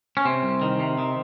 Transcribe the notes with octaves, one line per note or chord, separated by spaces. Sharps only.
C#4
C3 C4
C2
D#3
C3
D#3